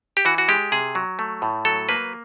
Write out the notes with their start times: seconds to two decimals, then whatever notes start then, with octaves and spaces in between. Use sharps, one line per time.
0.17 G4
0.25 E3 F#4
0.38 F#4
0.48 G#3 G4
0.72 C3 G#4
0.95 F#3
1.19 A3
1.42 A2
1.65 F#3 A4
1.89 A#3 B4